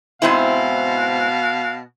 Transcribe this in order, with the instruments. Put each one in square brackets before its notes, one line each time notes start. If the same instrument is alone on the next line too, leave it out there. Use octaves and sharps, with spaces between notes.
[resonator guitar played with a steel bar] G#2 C4 E4 [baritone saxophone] B2 [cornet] F5